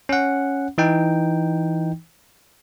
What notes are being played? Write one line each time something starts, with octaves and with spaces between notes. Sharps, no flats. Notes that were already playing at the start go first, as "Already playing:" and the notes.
C#4 F#5
E3 D#4 G5